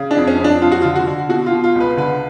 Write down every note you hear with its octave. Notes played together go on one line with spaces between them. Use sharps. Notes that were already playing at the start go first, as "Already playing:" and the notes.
Already playing: C#3
D4
F2
C#4
F2 D4
F2 F4
F#4
D3 F4
F#4
D3
B2 F#4
F4
B2
F4
C#2 B4
D3 B4